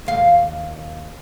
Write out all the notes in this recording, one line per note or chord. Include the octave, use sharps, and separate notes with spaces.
D#2 F5